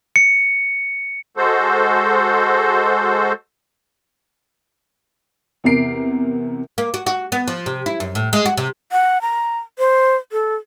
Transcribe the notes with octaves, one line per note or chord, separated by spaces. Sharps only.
C#7
G#3 F#4 A4 C5
E2 C3 A#4 C7 D7
A#3
F#4
F#4
B3
F3
C3
E4
F#2
A2
G#3
F#4
C3
F#5
A#5
C5
A4